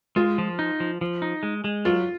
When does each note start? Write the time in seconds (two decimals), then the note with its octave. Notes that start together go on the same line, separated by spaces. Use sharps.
0.16 G#3 F4
0.38 F3
0.59 D#4
0.80 F3
1.01 F3
1.22 D#4
1.43 G#3
1.64 G#3
1.85 F#3 F4